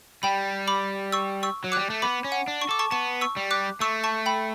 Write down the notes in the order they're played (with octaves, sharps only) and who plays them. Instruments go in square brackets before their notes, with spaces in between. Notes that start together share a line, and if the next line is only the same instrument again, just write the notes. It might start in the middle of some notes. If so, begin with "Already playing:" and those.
[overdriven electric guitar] G3 [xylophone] G5 B5
[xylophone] B5 D6
C#6 E6
C#6 E6
[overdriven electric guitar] F#3
[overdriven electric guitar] G3 [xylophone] D6 F#6
[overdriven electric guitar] A3
[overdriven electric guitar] B3 [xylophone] B5 D6
[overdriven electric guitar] C#4
[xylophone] F#5
[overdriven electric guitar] D4
[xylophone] C#6
[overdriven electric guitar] A4 [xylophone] D6
[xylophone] A5 C#6
[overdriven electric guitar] B3 [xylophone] A5 C#6
[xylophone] C#6 E6
[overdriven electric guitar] G3
[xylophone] D6 F#6
[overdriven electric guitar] A3 [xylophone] C#6 E6
[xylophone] A5 C#6
G5 B5